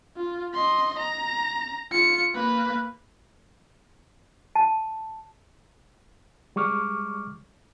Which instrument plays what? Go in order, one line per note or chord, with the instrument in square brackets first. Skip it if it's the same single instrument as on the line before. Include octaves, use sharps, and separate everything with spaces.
[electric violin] F4
D#5 C6
A#5
F4 C#7
A#3 B4
[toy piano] A5
[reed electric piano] G3 G#3 C#6 D6 F6